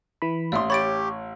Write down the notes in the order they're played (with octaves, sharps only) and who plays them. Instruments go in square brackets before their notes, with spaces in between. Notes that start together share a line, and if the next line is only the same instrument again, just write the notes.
[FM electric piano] E3 B5
[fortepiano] A1 C6 [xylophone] D5 E5 D#6
[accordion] G4 [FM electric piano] C#5 [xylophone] B5 A6 D7